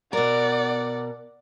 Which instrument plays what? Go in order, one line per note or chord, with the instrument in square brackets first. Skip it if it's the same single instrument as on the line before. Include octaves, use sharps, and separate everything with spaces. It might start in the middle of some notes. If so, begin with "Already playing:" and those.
[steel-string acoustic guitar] B2 A#4 [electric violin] D5 F#5